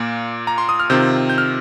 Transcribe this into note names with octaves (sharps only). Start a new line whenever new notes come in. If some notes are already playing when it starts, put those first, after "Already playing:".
Already playing: A#2 A#3
A#5
C6
D#6
F6
C3 D#3 C4 F4 G6
G6
F6